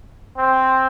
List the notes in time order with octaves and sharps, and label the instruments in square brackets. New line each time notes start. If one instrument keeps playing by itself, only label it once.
[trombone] C4